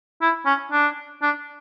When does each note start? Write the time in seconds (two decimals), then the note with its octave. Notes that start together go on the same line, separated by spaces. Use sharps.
0.21 E4
0.46 C#4
0.72 D4
1.22 D4